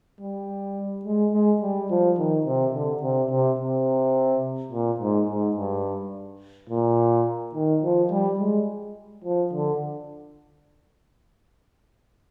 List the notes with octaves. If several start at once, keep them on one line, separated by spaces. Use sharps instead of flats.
G3
G#3
G#3
G3
F3
D#3
C3
D3
C3
C3
C3
A#2
G#2
G#2
G2
A#2
D#3
F3
G3
G#3
F3
D3